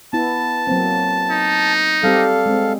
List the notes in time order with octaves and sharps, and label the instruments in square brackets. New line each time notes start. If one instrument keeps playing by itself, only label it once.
[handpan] B3 E4 [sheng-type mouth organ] A5
[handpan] F#3 A#3 C4
[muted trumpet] D#4
[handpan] G3 C4 G4 [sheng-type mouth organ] A4 F5
[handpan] G#3 C4